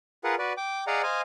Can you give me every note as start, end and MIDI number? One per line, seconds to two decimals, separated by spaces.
0.24 0.35 65
0.24 0.35 68
0.24 0.35 70
0.24 0.35 71
0.24 0.35 78
0.39 0.53 66
0.39 0.53 71
0.39 0.53 74
0.57 0.84 79
0.57 0.84 86
0.87 1.02 68
0.87 1.02 74
0.87 1.02 75
0.87 1.02 77
0.87 1.02 78
0.87 1.02 82
1.03 1.21 72
1.03 1.21 75
1.03 1.21 77
1.03 1.21 80